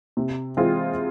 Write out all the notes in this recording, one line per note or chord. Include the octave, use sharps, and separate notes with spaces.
C3
E3 G#3 C4 F4